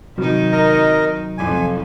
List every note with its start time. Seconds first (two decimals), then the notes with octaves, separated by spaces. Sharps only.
0.18 C3 D#3 F#3 D#4
0.52 A#4 D#5
1.38 F2 G#5